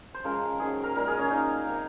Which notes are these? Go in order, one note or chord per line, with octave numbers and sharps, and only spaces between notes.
C5
C#3 F3 G#3 A#4
D#3 F#3 A#3 G#4
A#4
A#2 G#3 A#4
G#4
C#4
D#3 A#3 D#4
C3 F#3 A#3